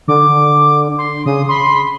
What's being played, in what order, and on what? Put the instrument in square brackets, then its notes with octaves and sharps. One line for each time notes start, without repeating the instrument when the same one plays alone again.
[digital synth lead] D3 [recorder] D6
[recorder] C6
[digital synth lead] C#3 [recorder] D#6
[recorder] B5 [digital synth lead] C6